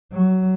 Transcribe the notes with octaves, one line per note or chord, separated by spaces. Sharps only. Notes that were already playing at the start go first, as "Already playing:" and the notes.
F#3